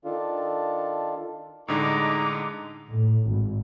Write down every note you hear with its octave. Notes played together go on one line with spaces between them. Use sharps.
D#3 D4 F4 A4
A2 D3 G#3 D#4 D#5 A#5 D6
A2
G#1